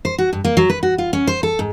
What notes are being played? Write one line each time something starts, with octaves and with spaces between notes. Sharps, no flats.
C5
F#4
G2
A#3
F#3
B4
F#4
F4
C#4
C5
A4
G#2